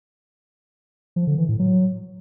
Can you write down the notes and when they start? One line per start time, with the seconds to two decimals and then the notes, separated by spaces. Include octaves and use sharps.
1.16 F3
1.27 D3
1.38 E3
1.49 A2
1.59 F#3